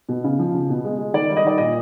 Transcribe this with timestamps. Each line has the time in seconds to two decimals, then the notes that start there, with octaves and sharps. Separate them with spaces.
0.09 B2
0.24 C#3
0.39 F3
0.54 C#3
0.69 B2
0.84 G#3
0.98 G#3
1.13 D#3 D5
1.29 G3
1.37 D#5
1.44 D#3 D5
1.58 A#2 D#5